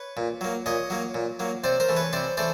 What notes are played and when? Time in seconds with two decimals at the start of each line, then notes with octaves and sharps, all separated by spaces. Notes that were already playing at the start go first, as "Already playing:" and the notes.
Already playing: B4 C#5
0.17 A#2
0.41 F#3 A#3
0.66 A#2 C#5 D#5
0.90 F#3 A#3
1.14 A#2
1.39 F#3 A#3
1.64 C3 C5 D5
1.80 A#4 C5
1.89 E3 A3
1.97 B4 C#5
2.13 C3 C5 D5
2.37 E3 A3 C5 D5